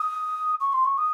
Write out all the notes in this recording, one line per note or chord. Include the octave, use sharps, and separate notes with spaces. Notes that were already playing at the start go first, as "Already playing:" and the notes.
Already playing: D#6
C#6
C6
C#6
D#6